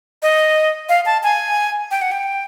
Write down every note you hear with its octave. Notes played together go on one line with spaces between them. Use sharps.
D#5
F5
A5
G#5
G5
F#5
G5